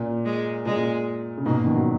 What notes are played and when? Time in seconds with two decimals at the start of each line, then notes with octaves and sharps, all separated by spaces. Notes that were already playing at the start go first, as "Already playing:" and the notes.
Already playing: A#2
0.25 G#3
0.65 A#2 G#3
1.38 C#3
1.45 G#2 B2 A#3
1.66 B2 D#3
1.76 F#3